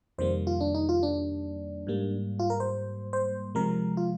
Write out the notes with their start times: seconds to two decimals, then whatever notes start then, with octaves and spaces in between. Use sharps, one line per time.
0.18 F2 C3 D#3 G3 A#3 C5
0.47 F4
0.61 D4
0.74 D#4
0.89 F4
1.03 D4
1.87 G#2 G3 A#3
2.39 F4
2.50 A#4
2.60 C5
3.13 C5
3.55 C3 F3 G#3 A#4
3.97 F4